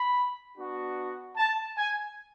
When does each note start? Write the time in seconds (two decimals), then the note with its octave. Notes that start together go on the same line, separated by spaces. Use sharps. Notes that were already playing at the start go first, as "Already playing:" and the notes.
Already playing: B5
0.57 B3 D4 F#4
1.37 A5
1.78 G#5